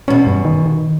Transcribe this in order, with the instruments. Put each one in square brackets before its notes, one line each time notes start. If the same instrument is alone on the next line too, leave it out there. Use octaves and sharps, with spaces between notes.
[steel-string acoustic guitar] E2 B2 [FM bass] C#4
[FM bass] G2
D#3
D#3